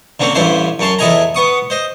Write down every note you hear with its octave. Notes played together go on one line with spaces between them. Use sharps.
D3 A#3 C4 C#4
A1 G2 C#4 E4 C5 C6
F#2 C#4 A5 C6
E2 E4 A4 D#5 G#5 A#5
B3 C#6 D#6
C5 D#5